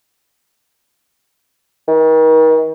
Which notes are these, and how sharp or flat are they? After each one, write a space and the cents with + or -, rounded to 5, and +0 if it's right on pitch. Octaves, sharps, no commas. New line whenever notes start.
D#3 +40